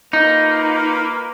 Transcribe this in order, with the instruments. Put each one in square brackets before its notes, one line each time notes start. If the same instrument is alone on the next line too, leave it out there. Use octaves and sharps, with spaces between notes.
[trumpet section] A#3 F4 B4 [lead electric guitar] D#4